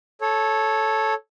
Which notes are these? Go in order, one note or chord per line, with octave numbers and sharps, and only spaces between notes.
A4 C#5